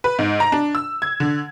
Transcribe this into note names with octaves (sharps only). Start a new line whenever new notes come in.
B4
G#2
A#5
D4
E6
G#6
D3